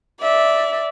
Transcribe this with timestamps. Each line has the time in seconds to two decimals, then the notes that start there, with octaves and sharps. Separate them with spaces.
0.21 D5 E5